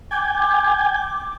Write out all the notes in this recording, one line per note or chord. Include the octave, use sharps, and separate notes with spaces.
G5 G#5 D6